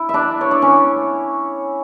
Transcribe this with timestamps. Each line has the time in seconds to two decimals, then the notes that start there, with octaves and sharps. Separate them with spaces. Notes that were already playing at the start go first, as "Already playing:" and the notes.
Already playing: E4
0.09 E5
0.14 D4 D5
0.41 C#5
0.51 D5
0.62 C#4 C#5